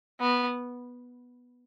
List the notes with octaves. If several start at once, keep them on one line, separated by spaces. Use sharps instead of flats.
B3